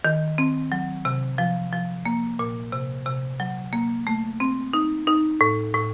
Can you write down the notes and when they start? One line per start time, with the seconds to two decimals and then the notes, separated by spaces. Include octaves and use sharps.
0.05 D#3
0.38 C4
0.72 F#3
1.05 C3
1.38 F3
1.72 F3
2.06 A#3
2.39 A#2
2.72 C3
3.06 C3
3.40 F#3
3.73 A#3
4.07 A3
4.40 C4
4.73 D#4
5.07 D#4
5.41 A2
5.74 A2